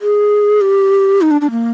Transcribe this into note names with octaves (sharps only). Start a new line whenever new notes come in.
G#4
G4
D#4
D4
D4
A#3